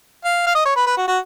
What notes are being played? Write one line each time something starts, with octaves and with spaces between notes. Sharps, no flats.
F5
F5
D#5
C#5
B4
B4
F#4
F#4